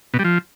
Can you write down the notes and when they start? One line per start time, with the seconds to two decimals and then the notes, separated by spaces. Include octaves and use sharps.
0.14 B2
0.19 G3
0.24 F3